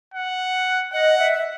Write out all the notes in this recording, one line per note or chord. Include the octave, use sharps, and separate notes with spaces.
F#5
D#5 F#5
E5